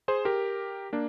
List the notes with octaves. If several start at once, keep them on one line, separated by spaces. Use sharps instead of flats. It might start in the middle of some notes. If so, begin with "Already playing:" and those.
G#4 C5
G4 A#4
A#3 D4